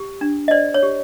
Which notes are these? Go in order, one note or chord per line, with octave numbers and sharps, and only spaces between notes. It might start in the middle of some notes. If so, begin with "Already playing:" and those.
Already playing: G4
D4
D#5
C5 D5
C#5
G4